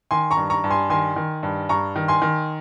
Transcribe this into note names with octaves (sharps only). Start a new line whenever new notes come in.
D#3 G#5 C6
A#5 C#6
G2
A#5 C#6
G2
G#5 C6
D#3 G#5 C6
D#3
G2
G2 A#5 C#6
D#3
G#5 C6
D#3